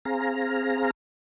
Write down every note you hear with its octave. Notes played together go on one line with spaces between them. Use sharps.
C4 G#4 F5 A#5